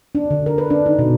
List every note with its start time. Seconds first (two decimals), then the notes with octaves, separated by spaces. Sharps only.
0.15 D4
0.31 D3
0.46 A#4
0.58 B4
0.70 D4
0.86 D#4
0.99 B2